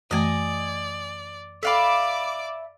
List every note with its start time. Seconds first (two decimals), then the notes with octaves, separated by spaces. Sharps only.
0.11 F#2 E3 A3 D5 D#5 G#5
1.63 A4 D5 E5 F5 B5 D6